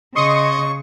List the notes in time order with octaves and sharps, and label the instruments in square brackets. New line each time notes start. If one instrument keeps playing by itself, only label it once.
[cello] C#3 [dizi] D#5 [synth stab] C6 D#6 C#7 [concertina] C#6